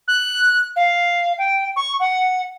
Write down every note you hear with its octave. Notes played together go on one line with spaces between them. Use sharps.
F#6
F5
G5
C#6
F#5